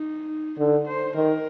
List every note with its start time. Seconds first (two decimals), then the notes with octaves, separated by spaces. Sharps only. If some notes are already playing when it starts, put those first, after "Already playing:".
Already playing: D#4
0.58 D3 D#4
0.87 C5
1.15 D#3 A#4